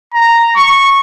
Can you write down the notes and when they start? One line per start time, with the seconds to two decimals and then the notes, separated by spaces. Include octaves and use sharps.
0.14 A#5
0.56 C#6